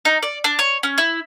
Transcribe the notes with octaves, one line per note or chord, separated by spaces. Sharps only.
D#4
D5
D4
C#5
C#4
E4